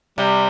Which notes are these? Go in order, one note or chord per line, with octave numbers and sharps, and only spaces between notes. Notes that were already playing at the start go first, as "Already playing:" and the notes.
C3 G3